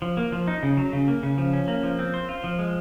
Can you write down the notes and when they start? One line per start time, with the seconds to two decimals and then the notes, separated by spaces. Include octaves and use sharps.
0.02 F3
0.17 A#3
0.32 F3
0.48 D#4
0.63 C#3
0.77 F#3
0.93 C#3
1.08 A#3
1.23 C#3
1.38 F3
1.53 C#4
1.68 A#3
1.83 F3
1.99 C4
2.14 C5
2.29 F4
2.44 F3
2.59 G#3